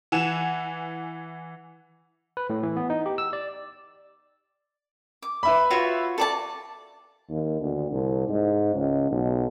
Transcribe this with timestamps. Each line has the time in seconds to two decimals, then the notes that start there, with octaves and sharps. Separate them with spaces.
0.12 E3 F#5 G#5 E7
2.37 B4
2.50 A2
2.63 E3
2.76 B3
2.90 D#4
3.06 G4
3.18 E6
3.33 D5
5.22 D6
5.43 B4 E5 B5
5.70 F4 F#4 C#5
6.18 A4 D5 A5
7.30 D#2
7.61 D2
7.91 C2
8.29 G#2
8.75 C#2
9.11 B1